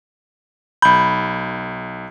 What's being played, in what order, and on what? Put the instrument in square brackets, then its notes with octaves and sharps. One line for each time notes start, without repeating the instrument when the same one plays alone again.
[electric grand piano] B1 G6 [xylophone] B5